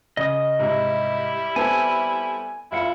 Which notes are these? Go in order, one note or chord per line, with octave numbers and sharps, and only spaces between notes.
C#3 D#5 D#6
G#2 C3 G3 E4
B3 C4 A4 G#5
G1 E4 F4 C#7